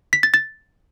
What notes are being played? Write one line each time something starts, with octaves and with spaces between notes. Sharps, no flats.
B6
A6
A6